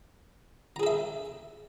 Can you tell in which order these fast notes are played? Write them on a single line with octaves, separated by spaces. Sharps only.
A#5 G#4 A4 E5